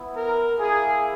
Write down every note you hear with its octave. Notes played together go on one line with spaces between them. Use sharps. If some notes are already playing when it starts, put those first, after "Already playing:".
Already playing: B3 E4
A#4
A#3 E4 G#4